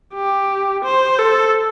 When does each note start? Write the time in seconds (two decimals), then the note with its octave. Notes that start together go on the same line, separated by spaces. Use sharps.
0.14 G4
0.84 C5
1.19 A4